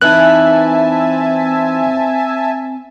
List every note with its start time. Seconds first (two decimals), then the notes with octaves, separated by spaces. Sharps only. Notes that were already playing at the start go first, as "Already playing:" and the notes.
0.01 E3 C4 D#4 E4 E5 G#5 A5 F#6